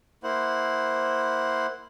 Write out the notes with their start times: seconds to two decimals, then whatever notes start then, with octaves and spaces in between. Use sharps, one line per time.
0.23 A#3 E4 C5 F#5